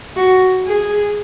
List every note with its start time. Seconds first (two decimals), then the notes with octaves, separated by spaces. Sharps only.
0.17 F#4
0.66 G#4